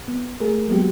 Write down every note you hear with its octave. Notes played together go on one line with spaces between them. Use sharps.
B3
A3 G#4 A#4
F#3 G#3 A#3 B3 F#4 G4